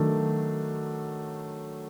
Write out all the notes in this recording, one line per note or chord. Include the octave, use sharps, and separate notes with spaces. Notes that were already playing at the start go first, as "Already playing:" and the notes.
Already playing: D#3 F#3 A3 D4